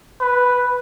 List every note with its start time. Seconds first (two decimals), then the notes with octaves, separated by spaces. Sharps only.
0.20 B4